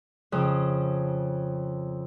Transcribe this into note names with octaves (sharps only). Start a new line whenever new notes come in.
F2 C#3